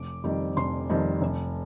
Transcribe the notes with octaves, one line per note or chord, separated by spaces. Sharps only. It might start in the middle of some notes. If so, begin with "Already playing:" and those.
Already playing: F1 D6
F2 D#3 G3 C4
F1 C6
F2 D#3 G3 C4
F1